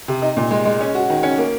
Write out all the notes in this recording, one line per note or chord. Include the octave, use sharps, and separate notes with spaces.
C3
D#4
A#2
G#3
G#3
C#4
F#4
D#3
C#4
A#3